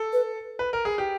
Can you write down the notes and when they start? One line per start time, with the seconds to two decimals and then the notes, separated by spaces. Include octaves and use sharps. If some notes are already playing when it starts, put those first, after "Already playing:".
Already playing: A4
0.13 B4
0.59 B4
0.73 A#4
0.85 G#4
0.98 G4